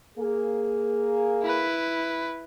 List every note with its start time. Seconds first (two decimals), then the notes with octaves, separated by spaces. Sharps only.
0.18 A#3 G#4
1.42 E4 B4